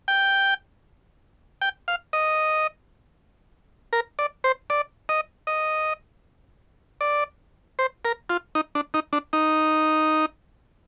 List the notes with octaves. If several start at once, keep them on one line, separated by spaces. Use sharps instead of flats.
G5
G5
F5
D#5
A#4
D5
C5
D5
D#5
D#5
D5
C5
A#4
F4
D#4
D4
D#4
D4
D#4